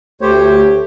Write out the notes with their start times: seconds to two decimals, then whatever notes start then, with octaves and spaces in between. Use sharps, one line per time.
0.21 D2 A3 G4 C5 C#5